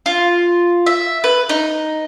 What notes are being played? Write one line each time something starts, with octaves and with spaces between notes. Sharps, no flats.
F4
E5
B4
D#4